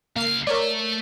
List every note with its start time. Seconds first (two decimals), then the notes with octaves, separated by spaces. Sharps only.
0.16 C#2 A#3 F5 C7
0.47 A3 A#4 C#5 D5 E5